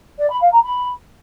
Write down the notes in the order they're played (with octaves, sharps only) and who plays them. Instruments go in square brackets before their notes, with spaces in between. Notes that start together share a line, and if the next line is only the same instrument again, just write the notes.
[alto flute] D5
B5
F5
A#5
B5